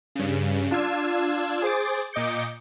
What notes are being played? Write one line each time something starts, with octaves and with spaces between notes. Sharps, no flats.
G2 C#3
D4 F4 E6 G#6
G#4 C5 D6 A6
A#2 D#5 D6 G6 C#7